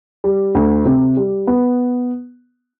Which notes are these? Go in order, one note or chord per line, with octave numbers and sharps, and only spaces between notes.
G3
D2
C3
G3
B3